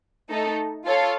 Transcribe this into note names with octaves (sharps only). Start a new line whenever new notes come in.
A3 D#4 A4
F4 A4 C#5 F5